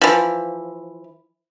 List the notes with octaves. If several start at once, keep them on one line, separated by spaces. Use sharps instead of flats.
E3 F3